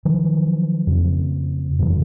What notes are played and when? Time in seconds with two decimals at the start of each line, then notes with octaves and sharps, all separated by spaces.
0.05 D#3 F3 F#3
0.87 F2 C#3
1.79 F#2 C#3 E3 F#3